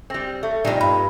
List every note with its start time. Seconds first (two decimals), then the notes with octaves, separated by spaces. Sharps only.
0.10 G3 C4
0.43 A3
0.65 F2 A#2 G3 D4 D#4
0.81 G2 B5